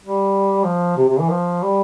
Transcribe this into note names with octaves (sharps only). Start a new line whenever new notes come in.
G3
F3
C3
C3
E3
F3
G3